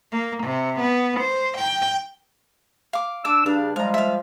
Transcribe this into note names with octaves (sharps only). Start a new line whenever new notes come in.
A#3
C3
B3
C5
G5
F5 D6
D4 D6 E6
G2 C#3 D4 F5
F3 G3 G#3 F5 A#5
E5 F5